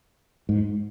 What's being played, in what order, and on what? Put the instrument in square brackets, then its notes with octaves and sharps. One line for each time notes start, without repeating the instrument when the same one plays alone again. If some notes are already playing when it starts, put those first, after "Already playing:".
[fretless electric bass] G#2